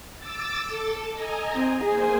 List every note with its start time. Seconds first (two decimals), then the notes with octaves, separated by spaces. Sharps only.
0.18 D6 E6 A6
0.64 A4
1.13 D#5 G#5 A#5
1.54 C4
1.85 A#3 G#4 C5 G#5